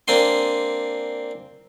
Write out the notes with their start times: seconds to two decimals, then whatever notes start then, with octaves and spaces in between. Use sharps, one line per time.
0.08 A#3 C4 D4 G#5 C6